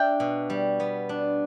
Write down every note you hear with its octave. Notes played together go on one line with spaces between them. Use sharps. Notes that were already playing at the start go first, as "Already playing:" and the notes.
Already playing: D4 E5 G5
B2
G3
B3
D4